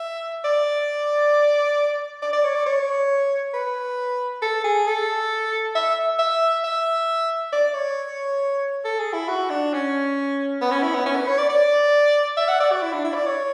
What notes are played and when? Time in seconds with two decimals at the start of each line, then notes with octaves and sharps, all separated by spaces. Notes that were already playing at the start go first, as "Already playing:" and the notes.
Already playing: E5
0.45 D5
2.22 D5
2.33 D5
2.44 C#5
2.55 D5
2.67 C#5
3.54 B4
4.42 A4
4.64 G#4
4.87 A4
5.75 E5
6.19 E5
6.64 E5
7.53 D5
7.74 C#5
8.85 A4
9.00 G#4
9.13 E4
9.29 F#4
9.50 D4
9.74 C#4
10.62 B3
10.72 C#4
10.83 E4
10.95 B3
11.06 C#4
11.16 B4
11.28 C#5
11.38 D5
11.50 D5
12.37 E5
12.49 F#5
12.60 D5
12.72 F#4
12.83 E4
12.93 D4
13.05 E4
13.15 D5
13.26 C#5